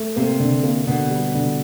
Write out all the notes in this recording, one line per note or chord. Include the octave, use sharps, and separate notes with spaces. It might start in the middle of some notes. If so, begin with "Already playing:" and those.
Already playing: A3
C3 A#3
D3
A#3
B2 D3
G3
D3